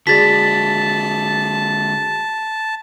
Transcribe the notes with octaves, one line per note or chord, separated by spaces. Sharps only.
D3 G#3 F#4 G#4 D5 A5 A6 B6